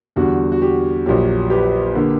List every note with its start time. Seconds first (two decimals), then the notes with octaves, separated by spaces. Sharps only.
0.16 E2 D3 G3 F#4
0.52 F#4
0.62 G4
1.06 A#1 A#2 F#3 G4
1.50 G4 B4
1.95 D3 A#3